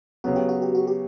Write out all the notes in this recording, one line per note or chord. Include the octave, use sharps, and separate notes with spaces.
C#3 F#3 B3 F#4
G4
F#4
G4
F#4
G4